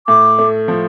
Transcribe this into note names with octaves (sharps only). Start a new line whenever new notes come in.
A2 D6
A3
F3